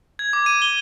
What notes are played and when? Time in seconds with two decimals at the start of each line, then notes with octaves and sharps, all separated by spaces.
0.19 G#6
0.33 D6
0.46 D#7
0.62 G7